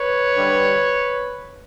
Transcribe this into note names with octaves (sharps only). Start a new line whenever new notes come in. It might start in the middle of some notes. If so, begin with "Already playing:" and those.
Already playing: B4 C#5
G2 D3 G3